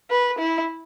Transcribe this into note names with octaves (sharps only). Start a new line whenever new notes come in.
B4
E4